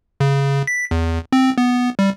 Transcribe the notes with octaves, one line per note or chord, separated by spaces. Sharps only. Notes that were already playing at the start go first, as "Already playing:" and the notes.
C#3
B6
E2
C4
B3
G3